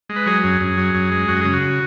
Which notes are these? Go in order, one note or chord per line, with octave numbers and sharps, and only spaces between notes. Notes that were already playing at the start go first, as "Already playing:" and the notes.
G#3
B4
F#3 G#4
F#2
F#2
F#3
F#2
G#3
F#2 F#4
C#3 G#4
F#4